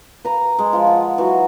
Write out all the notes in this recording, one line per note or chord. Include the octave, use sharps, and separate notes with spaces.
B4 A#5
G#3
F3 F4
F#5
E3 F#3 F#4